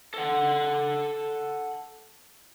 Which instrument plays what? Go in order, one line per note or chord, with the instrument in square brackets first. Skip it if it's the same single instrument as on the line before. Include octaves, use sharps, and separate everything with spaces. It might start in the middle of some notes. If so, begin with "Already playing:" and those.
[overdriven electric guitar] A4 F#5